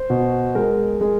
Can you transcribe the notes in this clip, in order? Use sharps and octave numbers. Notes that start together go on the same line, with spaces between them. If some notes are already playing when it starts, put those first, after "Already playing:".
Already playing: C5
B2
G#3 A#4
G#3